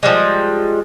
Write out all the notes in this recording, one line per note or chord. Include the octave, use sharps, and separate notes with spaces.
F3 G3 G#3